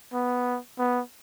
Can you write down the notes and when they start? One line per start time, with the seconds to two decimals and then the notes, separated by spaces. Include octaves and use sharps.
0.14 B3
0.79 B3